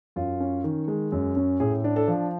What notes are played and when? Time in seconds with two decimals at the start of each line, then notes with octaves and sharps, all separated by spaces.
0.16 F#2 F4
0.40 C#4
0.64 D#3
0.88 G#3
1.12 F#2
1.36 C#4
1.60 A2 G#4
1.84 D4
1.96 A4
2.08 F3